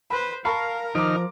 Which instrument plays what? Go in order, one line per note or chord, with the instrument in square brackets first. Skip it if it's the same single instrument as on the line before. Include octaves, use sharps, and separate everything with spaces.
[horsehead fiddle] B4 C5 [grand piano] B5
[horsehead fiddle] A#4 [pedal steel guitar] F5 [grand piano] A5 B5 C#6
[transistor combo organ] D#3 D#4 F6 [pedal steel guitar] F3 [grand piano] D6 D7